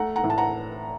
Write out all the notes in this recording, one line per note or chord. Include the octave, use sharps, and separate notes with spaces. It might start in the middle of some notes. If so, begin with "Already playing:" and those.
Already playing: A3 F#5 A#5
F#5 A#5
A2
A5
F#5 A#5